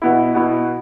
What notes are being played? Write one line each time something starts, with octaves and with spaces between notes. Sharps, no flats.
B2 B3 E4
B2 B3 E4